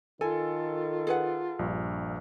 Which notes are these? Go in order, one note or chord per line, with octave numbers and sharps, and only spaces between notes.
D#3 F4 A4 G#5
G#4 B4 F#5
A#1 G2